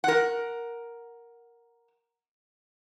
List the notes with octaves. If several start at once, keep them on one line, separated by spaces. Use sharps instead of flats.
A#4 F#5